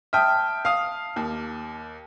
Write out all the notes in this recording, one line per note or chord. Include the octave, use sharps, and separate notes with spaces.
E5 G5 A5 D#6 F6
F5 D#6
D#2